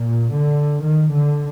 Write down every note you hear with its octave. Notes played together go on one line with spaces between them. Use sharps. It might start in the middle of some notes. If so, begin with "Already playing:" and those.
Already playing: A#2
D3
D#3
D3